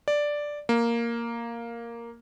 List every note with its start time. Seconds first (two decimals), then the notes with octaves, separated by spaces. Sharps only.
0.08 D5
0.69 A#3